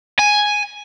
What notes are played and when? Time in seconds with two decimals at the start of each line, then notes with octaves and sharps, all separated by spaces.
0.19 G#5